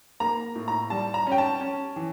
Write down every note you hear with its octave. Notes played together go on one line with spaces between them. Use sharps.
A#3 A#5
A2
A#5
G3 A5
A#5
C#4
G5
A5
C#4
E3